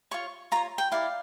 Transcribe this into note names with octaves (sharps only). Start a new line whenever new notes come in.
F4 C#5 C#6
F4 C#5 A#5
G5
E4 G4 D5 F5